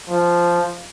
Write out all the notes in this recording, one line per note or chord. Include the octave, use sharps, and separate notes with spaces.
F3